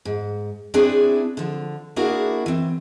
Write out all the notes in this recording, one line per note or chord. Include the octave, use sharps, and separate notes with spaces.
G#2
C4 D4 E4 G#4 B4
D3 F3
A#3 D4 E4 F#4 G#4 A#4
E3 C4